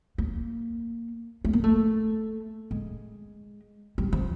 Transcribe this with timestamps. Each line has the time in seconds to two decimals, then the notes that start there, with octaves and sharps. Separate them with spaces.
0.18 A#3
1.45 A3
1.53 A#3
1.64 A3
2.71 G#3
3.98 G3
4.13 F3